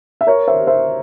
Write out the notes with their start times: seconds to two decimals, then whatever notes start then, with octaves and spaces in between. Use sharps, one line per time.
0.21 E5
0.27 A#4 C#5
0.48 C5 E5
0.67 C5 E5